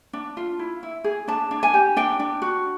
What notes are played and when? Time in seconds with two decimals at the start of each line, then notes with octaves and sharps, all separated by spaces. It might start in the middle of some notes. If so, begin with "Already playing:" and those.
0.13 D4
0.37 F4
0.59 E4
0.83 E4
1.04 G#4
1.28 D4 A5
1.51 D4
1.63 G#5
1.74 G4
1.96 D4 G5
2.19 D4
2.42 F#4